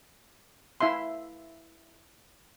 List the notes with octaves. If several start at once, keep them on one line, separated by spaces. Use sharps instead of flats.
E4 E5 F5 C6